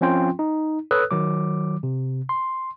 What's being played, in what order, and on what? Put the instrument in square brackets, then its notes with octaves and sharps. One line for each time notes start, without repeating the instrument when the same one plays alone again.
[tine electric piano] F3 C4 C#4 F4 G5 C6
D#4
A4 B4 C#5 D#6 E6 F#6
D#3 F#3 D6
C3
C6